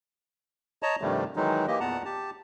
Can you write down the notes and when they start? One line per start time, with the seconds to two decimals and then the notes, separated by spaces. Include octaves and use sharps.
0.83 C#5 D#5 A5 A#5
1.02 G2 C3 D#3 F3 G3 A3
1.36 D#3 E3 F#3 G#3 D#4
1.68 E3 A#3 G4 D#5
1.80 E2 A#2 B3 F#5 A5 A#5
2.05 G4 A5